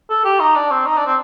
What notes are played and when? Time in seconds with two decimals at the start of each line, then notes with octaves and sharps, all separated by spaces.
0.09 A4
0.25 G4
0.40 D#4
0.55 D4
0.71 C4
0.86 D#4
0.97 D4
1.06 C4